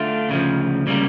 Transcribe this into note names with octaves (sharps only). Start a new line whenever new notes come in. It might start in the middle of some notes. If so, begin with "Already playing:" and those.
Already playing: D3 A3 D4 F4
D2 C#3 F3
C#3 G3 A#3